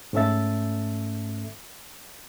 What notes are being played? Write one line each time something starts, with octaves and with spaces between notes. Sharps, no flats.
G#2 A3 C#4 A4 E5 A6